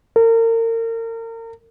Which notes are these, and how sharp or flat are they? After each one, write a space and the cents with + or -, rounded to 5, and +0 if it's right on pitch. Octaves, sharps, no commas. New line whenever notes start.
A#4 -35